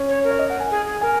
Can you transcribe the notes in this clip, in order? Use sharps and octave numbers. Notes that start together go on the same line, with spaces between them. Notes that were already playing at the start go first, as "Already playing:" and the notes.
Already playing: C#4
C#5
A#4
C#5
D#5
F#5
G#5
G#4
G#4
A#4 G#5